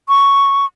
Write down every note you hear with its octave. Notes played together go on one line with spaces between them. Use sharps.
C#6